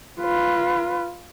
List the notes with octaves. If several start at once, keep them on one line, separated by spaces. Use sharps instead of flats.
F4 B4